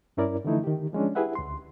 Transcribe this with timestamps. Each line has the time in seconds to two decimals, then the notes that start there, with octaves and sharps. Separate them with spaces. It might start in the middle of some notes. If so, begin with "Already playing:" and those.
0.17 G2 C#4 E4 A#4 D5
0.45 D3 E3 F3 A3 D#4 E4
0.64 D#3 G4
0.93 F3 G#3 C#4 D4
1.15 E4 G4 G#4 B4 E5 F#5
1.35 D2 C6